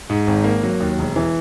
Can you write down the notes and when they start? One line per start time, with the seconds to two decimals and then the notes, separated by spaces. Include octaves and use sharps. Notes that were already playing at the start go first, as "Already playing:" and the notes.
0.10 G#2
0.27 G#1
0.44 A#3
0.63 F#3
0.80 D#2
0.99 E1
1.16 E3